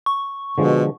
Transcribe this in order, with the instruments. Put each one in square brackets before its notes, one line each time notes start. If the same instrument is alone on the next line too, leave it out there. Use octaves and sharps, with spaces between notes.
[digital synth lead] C#6
[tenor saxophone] B2 [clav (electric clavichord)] D3 F3 G#3